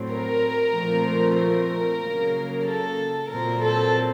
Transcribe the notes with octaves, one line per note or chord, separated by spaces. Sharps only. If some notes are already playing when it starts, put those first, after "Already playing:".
Already playing: A2 F#3 C4
A#4
A#2 F3 A3 C4
A#4
C#3 F#3 A#3
A4
A#2 F#3 C4 A#4
A4